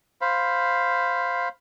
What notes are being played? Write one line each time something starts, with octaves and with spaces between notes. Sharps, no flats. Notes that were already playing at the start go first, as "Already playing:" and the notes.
C5 F5 B5